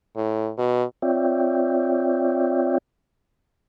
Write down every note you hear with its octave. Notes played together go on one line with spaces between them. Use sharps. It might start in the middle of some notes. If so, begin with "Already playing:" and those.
A2
B2
C4 F4 C#5 D5 E5 G5